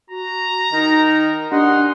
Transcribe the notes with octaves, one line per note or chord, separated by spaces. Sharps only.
F#4 A#5
D#3 D#4
D4 D#4 G4 F#5 C6